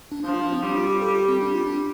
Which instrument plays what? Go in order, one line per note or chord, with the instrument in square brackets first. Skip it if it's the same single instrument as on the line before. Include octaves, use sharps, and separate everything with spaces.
[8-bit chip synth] D4
[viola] F3 [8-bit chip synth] D4
[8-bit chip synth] F4
D4
C4
[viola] G3 [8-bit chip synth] D4
[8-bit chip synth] F4
G4
A4
G4
C4
D4
F4
D4